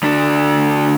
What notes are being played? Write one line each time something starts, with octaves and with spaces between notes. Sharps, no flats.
D2 D4